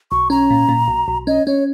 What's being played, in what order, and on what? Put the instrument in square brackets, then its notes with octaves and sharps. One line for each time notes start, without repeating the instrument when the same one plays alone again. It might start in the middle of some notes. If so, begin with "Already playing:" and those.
[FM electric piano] B1 [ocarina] C#6
[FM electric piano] C#4 [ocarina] A#5
[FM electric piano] A#2
A#2
B1
B1
[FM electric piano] C#4 [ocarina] D#5
[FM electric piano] C#4 [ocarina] C#5